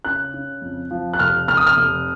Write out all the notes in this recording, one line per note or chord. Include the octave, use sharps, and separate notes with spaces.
C#3 F#6
C#3
F2
F3
F#6
F1 F6
F1 F6
D#6
F6
F1